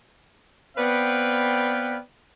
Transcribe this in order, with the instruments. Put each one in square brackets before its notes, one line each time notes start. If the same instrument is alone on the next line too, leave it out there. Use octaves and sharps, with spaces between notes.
[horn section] B3 C4 B4 D5 F5 G5